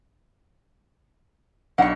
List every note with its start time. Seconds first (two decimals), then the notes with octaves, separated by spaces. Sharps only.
1.78 B1 D4 D#4 F#5 C#6